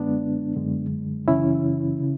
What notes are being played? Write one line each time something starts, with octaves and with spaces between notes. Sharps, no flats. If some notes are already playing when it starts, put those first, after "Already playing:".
Already playing: F#2 D3 G#3 B3 D4
F#2 D3 G#3
F#2 C#3 E3 C#4 E4
C#3